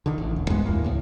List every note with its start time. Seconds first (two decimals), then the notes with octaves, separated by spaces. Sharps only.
0.06 D3 D#3
0.18 A1
0.36 D#1
0.50 B1 F#2 G#3 B3
0.65 D#2 A2 A#3
0.84 C#2 A2